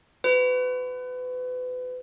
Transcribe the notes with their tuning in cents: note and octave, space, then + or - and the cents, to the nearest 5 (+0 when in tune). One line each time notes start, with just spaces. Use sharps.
F#4 +0 B4 +30